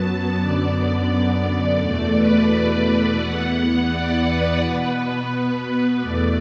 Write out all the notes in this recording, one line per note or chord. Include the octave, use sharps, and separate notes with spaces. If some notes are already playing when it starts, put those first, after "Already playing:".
Already playing: F#2 F#3 B3 A5
F#2 D3 B3 D5
E2 B2 A3 D5
B4
D5
D5
E2 E3 B3 F#5
F#5
D5
B4
B2 B3
E2 B2 A3 D5